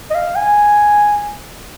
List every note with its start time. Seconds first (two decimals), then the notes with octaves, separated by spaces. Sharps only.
0.10 D#5
0.15 F5
0.36 G#5